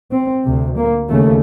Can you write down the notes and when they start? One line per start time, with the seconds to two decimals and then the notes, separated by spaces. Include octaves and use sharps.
0.12 C4
0.44 D2 C3
0.76 A#3
1.09 D#2 C#3 A3